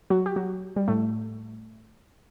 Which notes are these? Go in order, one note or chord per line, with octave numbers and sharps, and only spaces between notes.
F#3 F#4
G4
F#3 F#4
G3
A2 A3